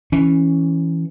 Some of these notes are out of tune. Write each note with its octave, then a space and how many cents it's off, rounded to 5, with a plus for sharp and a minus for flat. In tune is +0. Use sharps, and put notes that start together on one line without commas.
E3 +0 C#4 +0